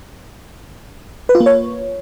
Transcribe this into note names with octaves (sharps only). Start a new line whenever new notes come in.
B4
F4
A#3
C#5